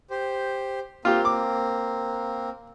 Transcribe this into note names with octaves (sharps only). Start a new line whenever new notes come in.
G4 C5
A#3 C4 F4 G4
D6